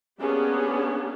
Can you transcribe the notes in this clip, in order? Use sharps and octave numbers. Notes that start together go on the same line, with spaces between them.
A#3 B3 C#4 D4 G4 G#4